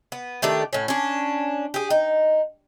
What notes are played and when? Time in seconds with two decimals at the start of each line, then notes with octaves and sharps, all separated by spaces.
0.12 B3
0.42 D#3 A3 D4 G4
0.73 A2 C#4
0.88 C#4 D4
1.74 G4 G#4
1.90 D#4